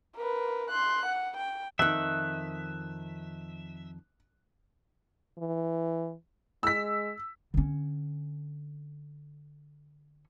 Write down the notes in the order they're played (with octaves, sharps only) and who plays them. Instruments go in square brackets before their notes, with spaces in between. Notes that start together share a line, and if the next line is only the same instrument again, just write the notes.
[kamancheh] A#4 B4
C6 F#6
F#5
G5
[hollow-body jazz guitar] F2 D#3 [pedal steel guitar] E5 [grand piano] F#6
[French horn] E3
[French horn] G#3 [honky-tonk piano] E6 B6
[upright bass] D3 C#4